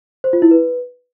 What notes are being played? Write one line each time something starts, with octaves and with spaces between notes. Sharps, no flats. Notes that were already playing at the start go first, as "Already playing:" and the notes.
C5
F4
E4
B4